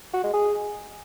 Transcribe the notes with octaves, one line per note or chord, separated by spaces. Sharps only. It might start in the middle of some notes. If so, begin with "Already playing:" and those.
F#4
G#3
G#4